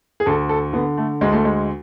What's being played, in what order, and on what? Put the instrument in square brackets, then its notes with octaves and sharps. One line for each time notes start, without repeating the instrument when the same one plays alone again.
[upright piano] G#4
D2 A4
A4
D3 B3
A3
D2 G#3
A3
G#3